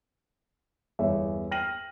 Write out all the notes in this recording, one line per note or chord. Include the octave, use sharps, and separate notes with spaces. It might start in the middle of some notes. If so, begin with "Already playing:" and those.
G1 E2 C#5 E5
G5 F6 A#6 D#7 F#7